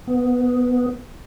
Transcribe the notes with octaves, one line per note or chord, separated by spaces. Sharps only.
B3